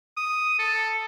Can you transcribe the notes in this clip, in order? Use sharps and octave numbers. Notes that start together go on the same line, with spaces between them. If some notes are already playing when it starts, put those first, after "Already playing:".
D#6
A4